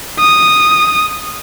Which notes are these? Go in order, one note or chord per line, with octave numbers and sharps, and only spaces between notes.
D#6